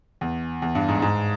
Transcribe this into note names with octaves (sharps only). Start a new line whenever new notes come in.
E2
E2
G2
G#2
G#2